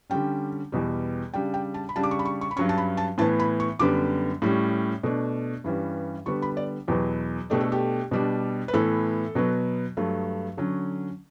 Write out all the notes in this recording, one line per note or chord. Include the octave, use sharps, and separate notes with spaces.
D3 G3 C#4 G5
E2 B2 G3
C#3 G3 D4 G5
G5
A5
B5
C#3 G3 D4 A5
D6
C#6
B5
C#6
C#6
B5
G2 F#3 C#4 C#6
A5
B5
A5
A2 E3 B3 A5
B5
C#6
F#2 D3 G3 B3 D6
A2 G3 C#4
B2 A3 D4
G2 E3 G3 C#4
D3 G3 B3 C#6
B5
D5
E2 B2 F#3 B3 G4
B2 A3 D4 G4
A4
G4
B2 G3 D4
B4
A2 E3 B3 A4
B2 F#3 B3
G2 F#3 A3
D3 F#3 C#4